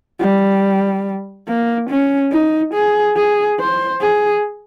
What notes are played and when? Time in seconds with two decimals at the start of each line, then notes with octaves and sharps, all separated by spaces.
0.20 G3
1.48 A#3
1.90 C#4
2.32 D#4
2.74 G#4
3.16 G#4
3.60 C5
4.02 G#4